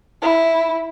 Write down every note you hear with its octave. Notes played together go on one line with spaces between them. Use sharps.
E4